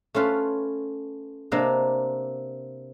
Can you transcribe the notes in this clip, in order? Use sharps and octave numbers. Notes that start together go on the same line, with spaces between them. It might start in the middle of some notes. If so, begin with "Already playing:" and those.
A3 C#4 F4 B4
C3 A#3 D4 D#5